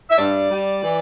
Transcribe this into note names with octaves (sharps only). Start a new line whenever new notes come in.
E5
G2 D5
G3
E3